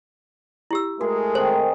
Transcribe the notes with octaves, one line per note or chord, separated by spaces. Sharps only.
E4 G4 E6
G#3 A3 F#4 G#4 A#4
D#3 C4 G#4 C5